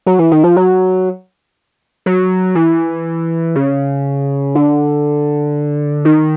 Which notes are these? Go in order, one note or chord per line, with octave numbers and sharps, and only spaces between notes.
F#3
E3
D#3
F3
F#3
F#3
E3
C#3
D3
D#3